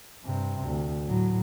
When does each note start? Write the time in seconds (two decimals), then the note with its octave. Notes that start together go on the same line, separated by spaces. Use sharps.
0.24 G2 C3
0.65 D2
1.07 A2 F#3